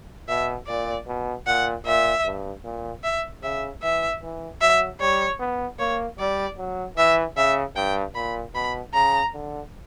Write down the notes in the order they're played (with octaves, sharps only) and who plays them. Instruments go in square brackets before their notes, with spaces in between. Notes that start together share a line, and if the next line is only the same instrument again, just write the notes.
[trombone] B2 [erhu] E5
[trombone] A#2 [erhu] D5
[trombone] B2
[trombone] A#2 [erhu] F#5
[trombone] A#2 [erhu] E5
[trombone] G2
A#2
[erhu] E5
[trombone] C#3 [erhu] E5
[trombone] E3 [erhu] E5
[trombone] E3
[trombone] F#3 [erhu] E5
[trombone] G3 [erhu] C#5
[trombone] B3
[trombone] A#3 [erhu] C#5
[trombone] G3 [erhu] D5
[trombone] F#3
[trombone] E3 [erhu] E5
[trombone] C#3 [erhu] E5
[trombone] G2 [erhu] G5
[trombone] A#2 [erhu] B5
[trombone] B2 [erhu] B5
[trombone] C#3 [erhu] A#5
[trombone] D3